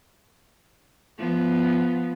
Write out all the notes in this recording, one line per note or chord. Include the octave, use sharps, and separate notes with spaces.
F3 B3